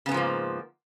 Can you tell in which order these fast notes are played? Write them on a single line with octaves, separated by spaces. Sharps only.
C#3 B3 G#2 F3 A#3